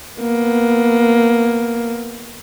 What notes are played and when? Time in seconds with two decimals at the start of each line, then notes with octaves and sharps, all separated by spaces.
0.21 A#3 B3